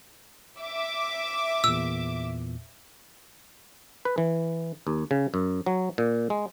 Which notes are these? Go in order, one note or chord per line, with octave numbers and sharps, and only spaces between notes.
E5 D6
E2 A#2 E6
B4
E3
D#2
C#3
F#2
F#3
A#2
G#3